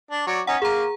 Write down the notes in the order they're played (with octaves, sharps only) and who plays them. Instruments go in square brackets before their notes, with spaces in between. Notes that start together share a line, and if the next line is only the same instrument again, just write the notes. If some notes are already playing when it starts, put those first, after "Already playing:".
[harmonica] D4
F#3 D5 C#6
[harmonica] C#4 D#4 [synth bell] F#5
[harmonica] A#3 [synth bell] G#4 A#5